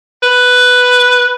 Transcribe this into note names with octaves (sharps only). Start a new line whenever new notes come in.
B4